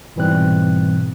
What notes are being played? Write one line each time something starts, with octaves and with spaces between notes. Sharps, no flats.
G#2 B2 E3 G3 C4 F#6